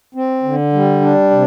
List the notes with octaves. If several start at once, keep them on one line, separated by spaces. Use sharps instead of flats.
C4
D3
G3
D4
C3